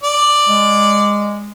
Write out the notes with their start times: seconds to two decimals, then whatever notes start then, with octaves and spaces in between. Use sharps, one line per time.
0.03 D5
0.49 G#3